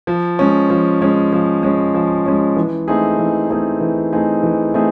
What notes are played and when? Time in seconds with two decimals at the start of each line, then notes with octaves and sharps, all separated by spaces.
0.07 F3
0.39 G#3 C#4
0.70 F3
1.02 G#3 C#4
1.32 F3
1.63 G#3 C#4
1.95 F3
2.26 G#3 C#4
2.56 E3
2.88 A3 C4 D#4 G#4
3.19 E3
3.50 A3 C4 D#4 G#4
3.81 E3
4.13 A3 C4 D#4 G#4
4.43 E3
4.74 A3 C4 D#4 G#4